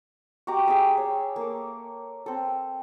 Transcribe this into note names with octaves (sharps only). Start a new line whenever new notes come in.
F#4 G4 A#5 D6
G#4 D5 E5 G5
C#5
A#3 A4
C4 A4